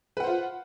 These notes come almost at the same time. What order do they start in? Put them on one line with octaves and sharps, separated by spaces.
B4 F#5 C5 F4